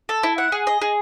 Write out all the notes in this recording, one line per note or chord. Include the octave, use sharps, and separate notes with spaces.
A4
E4
F#5
G#4
D#5
G#4